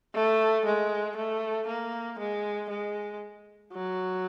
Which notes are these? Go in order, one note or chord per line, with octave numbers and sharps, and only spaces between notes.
A3
G#3
A3
A#3
G#3
G#3
F#3